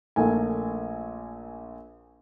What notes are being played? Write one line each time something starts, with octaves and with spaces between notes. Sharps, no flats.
A#1 A3 A#4 G#5